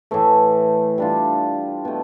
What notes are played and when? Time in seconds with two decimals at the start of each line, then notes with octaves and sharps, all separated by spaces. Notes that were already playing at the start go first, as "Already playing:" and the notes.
0.11 A2 E3 A3
0.98 G3 D4 F4
1.85 B2 A3